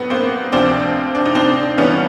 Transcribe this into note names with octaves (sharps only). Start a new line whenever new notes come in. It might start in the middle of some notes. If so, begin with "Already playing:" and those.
Already playing: A2 F#3 B3
A#3 C4
D2 C3 F3 C4 D4
D4
D#4
C4 D4
G2 E3 G3 B3 C#4